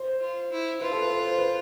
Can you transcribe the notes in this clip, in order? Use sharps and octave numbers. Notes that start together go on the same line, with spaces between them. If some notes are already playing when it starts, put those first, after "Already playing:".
Already playing: C5
F4
E4
F4 B4
A4
B4
C5
B4